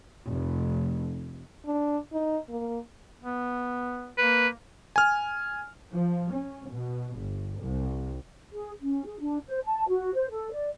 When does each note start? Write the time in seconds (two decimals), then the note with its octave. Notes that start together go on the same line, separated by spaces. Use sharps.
0.30 F1
1.66 D4
2.13 D#4
2.49 A#3
3.23 B3
4.18 A#3 B4
4.96 G#5 F6
5.91 F3
6.30 C#4
6.69 B2
7.17 G1
7.59 C2
8.53 G#4
8.81 C#4
9.05 G#4
9.20 D4
9.47 C5
9.65 A5
9.88 F#4
10.15 C5
10.30 A4
10.52 D5